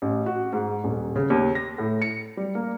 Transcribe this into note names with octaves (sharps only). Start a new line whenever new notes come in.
A1
F#4
G#2
D#1
C#3
D#2
A#6
A2
C#7
G3
A#3